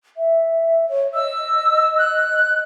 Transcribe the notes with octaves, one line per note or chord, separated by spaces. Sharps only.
E5
C#5
D#5 E6
F#6